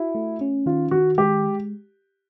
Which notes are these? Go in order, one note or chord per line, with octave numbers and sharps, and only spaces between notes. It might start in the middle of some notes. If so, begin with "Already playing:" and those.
Already playing: E4 F#4
A3
C#4
D#3 F4
D#3 F#4
G#3 G4